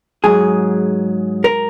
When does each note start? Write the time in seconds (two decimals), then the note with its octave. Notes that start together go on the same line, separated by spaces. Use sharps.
0.24 G#2 F#3 G#4
1.44 A#4